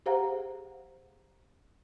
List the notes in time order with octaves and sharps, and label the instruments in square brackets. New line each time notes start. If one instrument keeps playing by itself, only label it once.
[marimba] G4 G#4 C5 F5 F#5 A#5